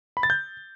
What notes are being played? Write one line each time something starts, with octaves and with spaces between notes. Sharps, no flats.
B5
A6
G6